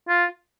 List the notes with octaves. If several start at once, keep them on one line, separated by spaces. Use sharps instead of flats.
F4